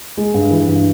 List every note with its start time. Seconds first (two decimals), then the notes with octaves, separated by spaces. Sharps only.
0.17 G#3
0.34 G2
0.51 E3
0.68 G2